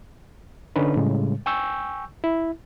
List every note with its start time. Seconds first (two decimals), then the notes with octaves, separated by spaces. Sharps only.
0.76 D3 C#4 D#4 B4
0.96 A2 C#3 G3 G#3
1.46 G5 G#5 C#6 E6 G6
2.24 E4